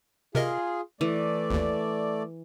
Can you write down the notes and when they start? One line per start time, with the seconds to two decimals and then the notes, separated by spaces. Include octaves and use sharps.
0.35 C3 F4 G#4 A#4 D#5
1.01 E3 A3 D5
1.50 G#1 D#2